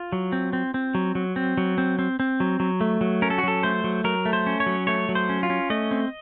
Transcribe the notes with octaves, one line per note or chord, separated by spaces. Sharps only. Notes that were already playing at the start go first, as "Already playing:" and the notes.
Already playing: F4
F#3
C4
C4
C4
F#3
F#3
C4
F#3
C4
C4
C4
F#3
F#3
A3
F#3
C#4 A#4
A4
F#4
F#3 A4
A3 C5
F#3
F#3 A#4
A3
C5
C#4
C#5
F#3
A3 C#5
F#3
C5
C#4
F4
C#4
A3 D#5
C4